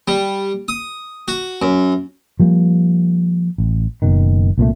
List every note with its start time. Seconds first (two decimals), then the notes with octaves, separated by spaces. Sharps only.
0.08 G3
0.68 D#6
1.28 F#4
1.62 F#2
2.40 F3 G3 A#3
3.58 A1
4.02 F#1 F#2 B2 D#3
4.58 C2 A#2 E3 A3